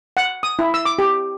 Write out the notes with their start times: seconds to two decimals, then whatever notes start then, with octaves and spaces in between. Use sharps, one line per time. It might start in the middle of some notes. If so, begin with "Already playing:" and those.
0.17 F#5
0.43 D#6
0.59 E4
0.74 E6
0.85 D6
0.99 G4